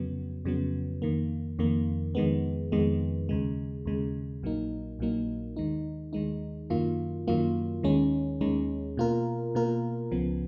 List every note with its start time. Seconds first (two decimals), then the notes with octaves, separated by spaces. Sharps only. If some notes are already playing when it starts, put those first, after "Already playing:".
Already playing: F2 C#3 F#3 B3
0.45 F2 C#3 F#3 B3
1.02 F2 D#3 A#3
1.59 F2 D#3 A#3
2.15 F2 D#3 G#3 B3
2.72 F2 D#3 G#3 B3
3.29 D#2 C#3 G#3
3.85 D#2 C#3 G#3
4.43 A#1 A#2 F#3 A#3 D#4
4.99 A#1 A#2 F#3 A#3 D#4
5.56 D#2 D#3 G#3 D#4
6.13 D#2 D#3 G#3 D#4
6.70 F#2 D#3 F#3 A#3 F4
7.27 F#2 D#3 F#3 A#3 F4
7.83 D#2 D#3 G#3 C#4
8.41 D#2 D#3 G#3 C#4
8.97 B2 A#3 F4 A#4
9.55 B2 A#3 F4 A#4
10.11 C#2 C#3 F3 B3